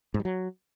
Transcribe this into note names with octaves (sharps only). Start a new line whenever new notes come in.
G#2
G3
F#3